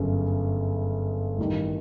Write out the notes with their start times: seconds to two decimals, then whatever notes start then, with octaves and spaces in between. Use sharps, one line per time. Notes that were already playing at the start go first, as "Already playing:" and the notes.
Already playing: G1 F#2 C#3
1.38 A1 G2 D#3 G3